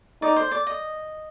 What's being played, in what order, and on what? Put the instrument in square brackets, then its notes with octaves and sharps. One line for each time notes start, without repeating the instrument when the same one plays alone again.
[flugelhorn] D#4 [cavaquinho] D5
[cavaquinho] C5
D5
D#5